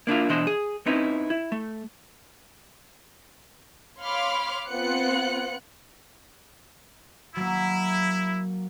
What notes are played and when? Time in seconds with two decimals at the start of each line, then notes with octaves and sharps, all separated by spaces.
0.07 A#3 D4 E4 F4
0.29 B2 E3 D4 E4 C5 D#5
0.47 G#4
0.86 C4 C#4 D#4 E4 B4
1.30 E4
1.52 A3
4.02 C#5 F5 B5 C6 D6 F6
4.68 B3 C4 F4 F#5 F#6 C#7
7.36 F#3 A#3 E4